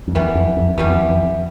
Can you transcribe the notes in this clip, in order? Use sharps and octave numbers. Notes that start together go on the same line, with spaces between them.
F2
E2 E3 G3 B3
F2
F2
E2 E3 G3 B3
F2
E2
F2